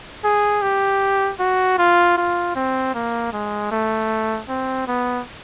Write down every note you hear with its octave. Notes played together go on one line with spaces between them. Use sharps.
G#4
G4
F#4
F4
F4
C4
A#3
G#3
A3
C4
B3